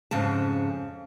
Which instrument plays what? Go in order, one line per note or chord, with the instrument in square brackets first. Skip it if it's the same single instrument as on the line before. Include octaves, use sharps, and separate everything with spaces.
[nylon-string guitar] F2 G#2 C#3 A5